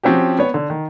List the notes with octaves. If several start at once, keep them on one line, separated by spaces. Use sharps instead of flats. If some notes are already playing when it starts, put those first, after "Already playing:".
F3 C4 C#4 F#4 G4
B3 C#5
D3
D#3